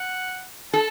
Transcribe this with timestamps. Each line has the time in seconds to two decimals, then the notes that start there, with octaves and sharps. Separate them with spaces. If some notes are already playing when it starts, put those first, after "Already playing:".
Already playing: F#5
0.72 A4 A5